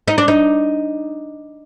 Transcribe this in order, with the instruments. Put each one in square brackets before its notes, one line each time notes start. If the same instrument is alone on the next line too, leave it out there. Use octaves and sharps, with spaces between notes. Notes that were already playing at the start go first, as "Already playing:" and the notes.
[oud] D#4
D4
D#4